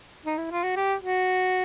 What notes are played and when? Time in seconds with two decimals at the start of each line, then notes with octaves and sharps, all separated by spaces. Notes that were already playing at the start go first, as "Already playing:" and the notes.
0.26 D#4
0.38 E4
0.51 F4
0.64 F#4
0.76 G4
1.02 F#4